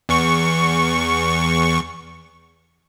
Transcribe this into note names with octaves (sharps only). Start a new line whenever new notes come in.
E2 C#6